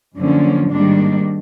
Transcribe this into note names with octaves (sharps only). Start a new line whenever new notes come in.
F#2 D3 F3 A#3 C#4
G#2 D#3 G3 A#3 D4